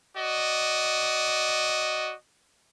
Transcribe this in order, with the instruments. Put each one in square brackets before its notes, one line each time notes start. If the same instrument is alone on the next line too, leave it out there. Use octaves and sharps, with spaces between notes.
[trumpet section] F#4 D5 D#5